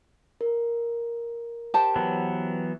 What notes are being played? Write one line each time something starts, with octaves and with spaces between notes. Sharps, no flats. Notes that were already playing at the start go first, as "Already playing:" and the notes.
A#4
G4 C5 A5
E3 F#3 B3